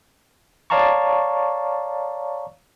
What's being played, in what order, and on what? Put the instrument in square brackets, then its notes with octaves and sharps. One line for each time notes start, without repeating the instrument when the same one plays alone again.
[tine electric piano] C#5 D5 F5 A5 A#5 C#6